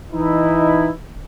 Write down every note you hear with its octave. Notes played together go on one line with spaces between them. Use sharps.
E3 D#4 E4